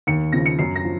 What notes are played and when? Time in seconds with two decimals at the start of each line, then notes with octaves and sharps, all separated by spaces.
0.07 D#2 C#7
0.32 C#3 F3 A#6
0.46 C#7
0.59 F#2 C7
0.76 A#6
0.84 F3